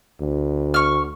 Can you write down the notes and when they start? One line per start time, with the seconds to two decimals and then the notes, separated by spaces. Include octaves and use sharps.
0.21 D2
0.74 C#6 F6